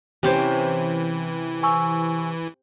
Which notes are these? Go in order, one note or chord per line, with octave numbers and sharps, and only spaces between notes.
C3 E3 C#4 G4 C5 D6
G#5 C#6 E6